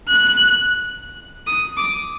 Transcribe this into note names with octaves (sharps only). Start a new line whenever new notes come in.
F#6
D#6
D6